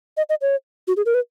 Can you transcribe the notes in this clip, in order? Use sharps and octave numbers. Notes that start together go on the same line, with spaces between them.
D#5
D#5
C#5
F#4
G#4
A#4
B4